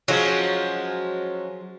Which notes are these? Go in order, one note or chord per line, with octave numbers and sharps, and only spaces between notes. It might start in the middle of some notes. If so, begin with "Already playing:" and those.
F3 F#3 G#3 C#4